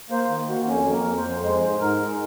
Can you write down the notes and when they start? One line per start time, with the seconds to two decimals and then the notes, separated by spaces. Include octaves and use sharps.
0.10 A#3 C5
0.29 D#3
0.48 A#3 F#4
0.68 F2 C#4
0.86 A#3
0.92 A#4
1.04 F2
1.18 C5
1.24 F2
1.43 G#3 C5
1.61 G#2
1.80 G#2 A#4
1.99 G#3